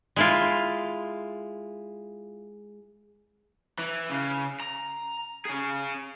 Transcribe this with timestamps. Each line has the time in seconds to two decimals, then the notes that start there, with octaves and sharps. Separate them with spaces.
0.16 G#3 E4 F4
3.78 E3
4.10 C#3
4.60 A#5
5.45 C#4 G#4